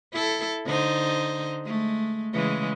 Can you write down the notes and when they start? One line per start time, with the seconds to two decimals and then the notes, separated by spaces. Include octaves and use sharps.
0.12 E4 A4
0.65 D3 D#4 C5
1.65 G#3 A3
2.33 C#3 E3 G#3